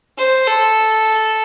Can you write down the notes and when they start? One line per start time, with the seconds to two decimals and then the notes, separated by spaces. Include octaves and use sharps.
0.18 C5
0.47 A4